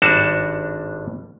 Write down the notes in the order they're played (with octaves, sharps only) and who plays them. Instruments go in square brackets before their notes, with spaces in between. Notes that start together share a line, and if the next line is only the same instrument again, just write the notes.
[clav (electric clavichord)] G#1 G2 G3 D4 F#4 A5